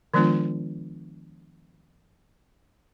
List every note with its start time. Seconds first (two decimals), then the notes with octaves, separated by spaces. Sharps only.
0.14 D#3 F3 G#3 B3 D4 F4